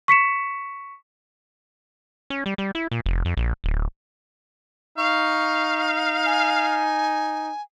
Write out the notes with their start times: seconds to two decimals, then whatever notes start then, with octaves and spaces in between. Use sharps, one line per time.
0.08 C#6 B6 C#7 E7
2.30 C#4
2.46 G3
2.58 G3
2.75 E4
2.91 A#2
3.06 F1
3.25 F2
3.37 A#1
3.64 D1
4.98 D#4 F5 C#6
6.26 G#5